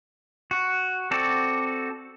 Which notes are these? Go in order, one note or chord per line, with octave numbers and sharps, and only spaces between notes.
F#4
C4 F#4 A4 D5